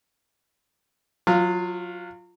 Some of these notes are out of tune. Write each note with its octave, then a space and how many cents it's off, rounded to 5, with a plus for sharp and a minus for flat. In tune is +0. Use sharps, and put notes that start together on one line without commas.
F#3 -25 F4 +0 F5 +0